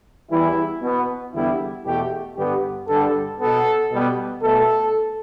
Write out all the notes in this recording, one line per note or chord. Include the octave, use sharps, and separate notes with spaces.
E2 E3 G3 E4
B2 B3
E2 D3 G3 B3 E4
E2 B2 A3 G4
G2 D3 B3 G4
G2 D3 G3 A4
B2 B3 A4
B2 G3 B3
B2 A3 A4